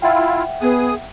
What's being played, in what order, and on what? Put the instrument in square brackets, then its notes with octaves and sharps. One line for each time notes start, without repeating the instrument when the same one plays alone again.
[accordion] E4 F4 [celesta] E5 F#5 G5
[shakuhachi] B3 [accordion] G#4 D#6